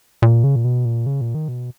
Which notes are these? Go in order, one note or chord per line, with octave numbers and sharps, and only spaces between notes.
A#2
C#3
A#2
B2
A#2
C#3
A#2
D#3
B2